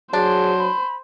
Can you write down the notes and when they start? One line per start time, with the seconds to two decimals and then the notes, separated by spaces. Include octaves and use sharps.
0.13 F#3 D4 G#4 C5
0.58 B5